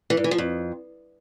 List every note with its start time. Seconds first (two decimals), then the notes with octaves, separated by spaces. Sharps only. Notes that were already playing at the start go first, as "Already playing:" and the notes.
0.10 E3
0.17 G2
0.24 E3
0.31 F3
0.38 F2